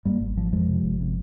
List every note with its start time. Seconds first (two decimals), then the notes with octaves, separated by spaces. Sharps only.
0.05 G2 G3 A#3
0.21 G#1
0.36 G#1 F3
0.52 F2 F3 G#3
0.68 C3
0.84 G1
1.00 C3